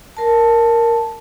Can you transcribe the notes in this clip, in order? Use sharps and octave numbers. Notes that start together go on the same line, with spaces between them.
A#4 A5